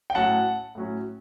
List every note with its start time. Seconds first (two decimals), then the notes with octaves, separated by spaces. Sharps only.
0.10 G5
0.15 A2 F#3 C#4 F#5 A5
0.75 A2 F#3 C#4